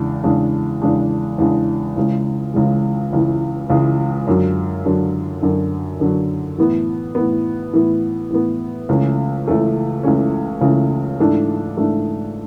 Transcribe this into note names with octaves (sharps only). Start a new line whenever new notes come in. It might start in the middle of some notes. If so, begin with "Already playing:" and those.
Already playing: E2 C#3 G#3 D4
E2 C#3 G#3 D4
E2 C#3 G#3 D4
E2 C#3 G#3 D4
C#2 C#3 E3 G#3
C#2 C#3 E3 G#3
C#2 C#3 E3 G#3
C#2 C#3 E3 G#3
F#2 D3 F#3
F#2 D3 F#3
F#2 D3 F#3
F#2 D3 F#3
A2 E3 B3
A2 E3 B3
A2 E3 B3
A2 E3 B3
C#2 C#3 E3 A3 C#4
C#2 C#3 E3 A3 C#4
C#2 C#3 E3 A3 C#4
C#2 C#3 E3 A3 C#4
G#2 E3 A3 D4
G#2 E3 A3 D4